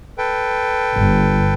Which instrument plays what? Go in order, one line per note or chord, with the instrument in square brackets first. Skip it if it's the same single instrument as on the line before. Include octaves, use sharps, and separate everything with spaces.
[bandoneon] A4 B4 G5
[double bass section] G1